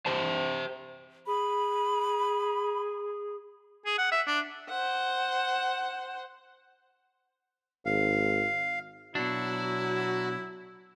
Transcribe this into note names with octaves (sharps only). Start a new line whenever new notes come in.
G4 C5 A5
G#4 B5
G#4
F#5
E5
D4
C5 F#5
G#1 F5
B2 F#3 D4 E4 F#4